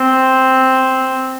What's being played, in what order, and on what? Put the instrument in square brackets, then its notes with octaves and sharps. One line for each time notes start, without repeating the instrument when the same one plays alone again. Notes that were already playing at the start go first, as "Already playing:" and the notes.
Already playing: [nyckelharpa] C4